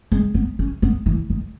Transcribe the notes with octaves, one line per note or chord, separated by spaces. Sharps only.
G#3
B3
C#4
B3
E3
D#3